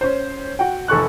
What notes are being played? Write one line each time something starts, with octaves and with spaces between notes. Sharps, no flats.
C#4 C5
F#4 F#5 G5
F1 A4 C#6 F#6